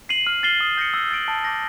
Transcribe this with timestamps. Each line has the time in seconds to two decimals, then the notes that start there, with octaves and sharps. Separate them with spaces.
0.09 C7 D#7 F#7
0.27 F6
0.43 A6 C7 E7 G7
0.60 D#6
0.77 G6 A#6 C#7
0.94 E6
1.11 A6 D7 F#7
1.28 A5
1.44 D6 G6 A#6